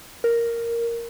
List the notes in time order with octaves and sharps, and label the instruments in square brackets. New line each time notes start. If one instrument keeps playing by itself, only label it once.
[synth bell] A#4